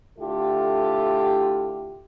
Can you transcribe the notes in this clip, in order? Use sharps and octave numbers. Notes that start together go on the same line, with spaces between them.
D3 A3 E4 F4 G4 A4